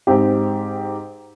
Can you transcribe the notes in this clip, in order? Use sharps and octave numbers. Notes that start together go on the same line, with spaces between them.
G#2 C4 G4